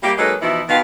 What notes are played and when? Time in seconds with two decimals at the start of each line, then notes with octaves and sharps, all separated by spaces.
0.03 G3 A#3 E4 G4
0.18 F#3 G#3 A#3 D#4 A4 B4
0.42 B2 E3 F3 D#4 E4
0.69 B2 D#3 F#4 B4 F5